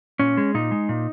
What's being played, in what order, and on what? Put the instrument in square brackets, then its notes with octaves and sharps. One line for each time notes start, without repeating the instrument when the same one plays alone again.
[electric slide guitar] A#2 C#4
G#3
A#2 D#4
G#3
A#2